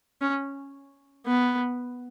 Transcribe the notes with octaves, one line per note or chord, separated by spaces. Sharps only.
C#4
B3